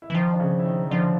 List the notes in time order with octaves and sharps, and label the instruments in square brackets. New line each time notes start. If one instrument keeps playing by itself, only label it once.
[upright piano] E4
[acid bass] E3
[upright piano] D#3 D#4 [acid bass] F3
[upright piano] D4
C#3 C#4
E4
D#3 D#4
[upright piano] D3 D4 [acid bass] F3